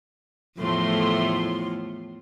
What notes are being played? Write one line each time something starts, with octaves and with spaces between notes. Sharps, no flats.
E2 A2 F3 A3 C6